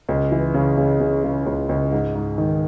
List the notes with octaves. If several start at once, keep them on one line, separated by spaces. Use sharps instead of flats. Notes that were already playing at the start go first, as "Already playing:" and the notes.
C#2
E3
C#3
C#3
C#3
C#3
C#2
C#2
G#2
G#2
D#3